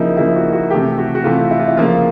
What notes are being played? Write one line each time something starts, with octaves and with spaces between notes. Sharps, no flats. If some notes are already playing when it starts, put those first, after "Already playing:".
Already playing: C#3 F3 A#3 D#4 E4
C#3 F3 A#3 E4
F#4
F#4
C3 E3 A3 G4
F#4
F#4
C3 E3 A3 F4
E4
F4
E4
C#3 F3 A#3 F4